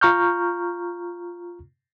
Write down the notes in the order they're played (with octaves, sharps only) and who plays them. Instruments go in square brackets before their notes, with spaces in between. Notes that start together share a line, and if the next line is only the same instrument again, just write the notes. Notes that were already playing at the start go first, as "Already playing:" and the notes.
[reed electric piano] F4 A#5 C#6 F6 G6